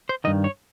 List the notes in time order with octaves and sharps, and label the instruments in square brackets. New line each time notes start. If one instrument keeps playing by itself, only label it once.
[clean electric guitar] C5
G2 D#3 D#5
C#5